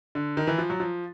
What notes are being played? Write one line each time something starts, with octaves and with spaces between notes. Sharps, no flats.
D3
D#3
E3
F3
F#3
F3